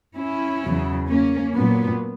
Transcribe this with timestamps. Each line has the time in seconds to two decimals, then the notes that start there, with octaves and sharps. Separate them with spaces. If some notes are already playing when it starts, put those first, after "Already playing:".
0.16 C#4 E4
0.62 E2 C#3 F#3
1.08 A#3 C#4
1.54 A#2 F#3 B3